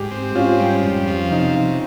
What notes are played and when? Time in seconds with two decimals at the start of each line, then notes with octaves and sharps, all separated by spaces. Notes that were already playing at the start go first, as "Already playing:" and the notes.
Already playing: G#2 G4
0.11 C4
0.35 G#2 C#4 F4
0.59 G3
0.83 F2
1.07 F3
1.31 C3 D#4